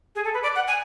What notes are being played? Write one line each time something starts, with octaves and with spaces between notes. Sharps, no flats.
G#4
A4
B4
D5
F#5
G#5